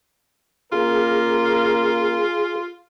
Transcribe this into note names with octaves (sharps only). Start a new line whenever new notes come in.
C#3 A#3 F4 G#4 A#4